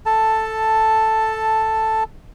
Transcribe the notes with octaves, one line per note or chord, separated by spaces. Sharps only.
A4 A5